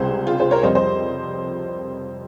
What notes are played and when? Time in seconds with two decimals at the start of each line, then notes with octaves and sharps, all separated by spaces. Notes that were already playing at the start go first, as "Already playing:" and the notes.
Already playing: C#2 C3 G3 G#4 C5
0.27 F4 G#4
0.39 G#4 C5
0.51 A#4 C#5
0.63 F2 C3 G3 C5 D#5
0.75 C5 D#5